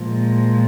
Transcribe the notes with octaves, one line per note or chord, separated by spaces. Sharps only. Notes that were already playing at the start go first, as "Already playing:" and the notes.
Already playing: A#2 F3 G#3